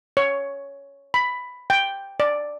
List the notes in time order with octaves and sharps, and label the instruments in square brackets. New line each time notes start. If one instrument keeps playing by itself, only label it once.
[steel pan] C#5
B5
G5
D5